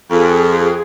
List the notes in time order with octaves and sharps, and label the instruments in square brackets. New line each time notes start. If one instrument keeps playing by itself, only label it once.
[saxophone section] F2 [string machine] G#4 [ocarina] A4